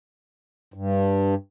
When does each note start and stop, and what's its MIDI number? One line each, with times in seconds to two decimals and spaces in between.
0.74 1.35 43